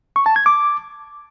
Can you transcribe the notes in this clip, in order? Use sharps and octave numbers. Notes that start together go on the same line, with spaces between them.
C#6
A5
G#6
D6